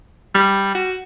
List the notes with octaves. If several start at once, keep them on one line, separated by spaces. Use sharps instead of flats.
G3
F#4